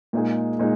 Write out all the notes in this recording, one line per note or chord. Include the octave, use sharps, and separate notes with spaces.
A#2 G#3 D#4 G#4
A#2 G#3 D#4